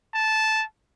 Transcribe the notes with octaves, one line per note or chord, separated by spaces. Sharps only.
A5